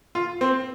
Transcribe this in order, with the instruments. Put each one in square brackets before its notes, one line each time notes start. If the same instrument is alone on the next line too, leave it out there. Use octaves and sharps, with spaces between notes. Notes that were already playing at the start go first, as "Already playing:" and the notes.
[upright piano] F4
C4